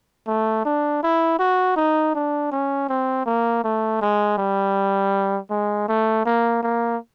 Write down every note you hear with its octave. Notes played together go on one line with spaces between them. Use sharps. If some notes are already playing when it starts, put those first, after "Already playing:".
A3
D4
E4
F#4
D#4
D4
C#4
C4
A#3
A3
G#3
G3
G#3
A3
A#3
A#3